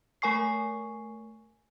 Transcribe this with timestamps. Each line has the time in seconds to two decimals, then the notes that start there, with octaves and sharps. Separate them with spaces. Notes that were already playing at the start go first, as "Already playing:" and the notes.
0.22 A3 A#4 G#5 C#6 C7